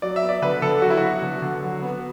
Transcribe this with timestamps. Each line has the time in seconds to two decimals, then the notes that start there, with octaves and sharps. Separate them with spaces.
0.02 F#3 D5
0.16 E5
0.23 B3
0.29 D5
0.42 D3 B4
0.62 D3 A4
0.82 F#3 F#4
0.90 E4
0.97 B3 F#4
1.22 D3
1.42 D3
1.62 F#3
1.82 B3